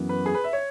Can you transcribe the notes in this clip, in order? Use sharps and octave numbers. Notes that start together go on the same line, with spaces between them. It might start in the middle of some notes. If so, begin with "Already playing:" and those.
Already playing: F#2 E3 B3
B4
G#4
B4
E5
C#5